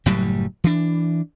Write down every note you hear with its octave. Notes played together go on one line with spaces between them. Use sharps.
F#1 A2 F#3 G3
E3 D4